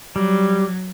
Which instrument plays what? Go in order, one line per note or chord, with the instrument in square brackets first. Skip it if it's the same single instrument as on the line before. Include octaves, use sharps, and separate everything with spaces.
[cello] F#3 [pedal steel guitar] G3